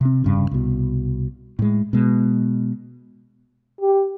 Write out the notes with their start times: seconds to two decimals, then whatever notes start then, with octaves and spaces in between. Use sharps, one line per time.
0.01 C3 C4
0.24 F1 G2 C#3
0.51 C2 B2
1.59 A2 G#3
1.93 B2 G#3
3.81 G4